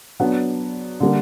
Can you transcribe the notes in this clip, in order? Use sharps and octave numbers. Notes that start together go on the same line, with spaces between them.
F#3 B3 D4
D3 G3 A#3